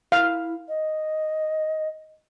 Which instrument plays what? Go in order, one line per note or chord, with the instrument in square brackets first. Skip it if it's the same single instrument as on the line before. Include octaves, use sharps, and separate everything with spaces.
[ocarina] E4 [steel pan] F5
[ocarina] D#5